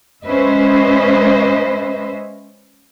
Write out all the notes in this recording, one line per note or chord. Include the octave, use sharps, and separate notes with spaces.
G#3 C#4 B4 C5 D#5 E5